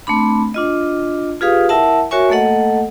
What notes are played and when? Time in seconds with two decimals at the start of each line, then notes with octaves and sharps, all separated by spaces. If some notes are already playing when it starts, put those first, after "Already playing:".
0.07 A3 C4 D4 B5
0.54 D4 F4 D#5
1.41 F4 G4 G#4 B4 F5 D#6
1.69 E4 A#4 E5 F#5 A5
2.11 F#4 A#4 C#5 E5 G#5 C#6
2.30 A3 A#3 A4 D#5 F#5